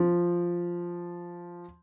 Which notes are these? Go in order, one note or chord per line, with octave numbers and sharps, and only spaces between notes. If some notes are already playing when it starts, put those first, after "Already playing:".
Already playing: F3